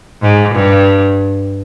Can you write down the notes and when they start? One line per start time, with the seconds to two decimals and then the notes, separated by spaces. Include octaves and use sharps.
0.23 G#2
0.55 G2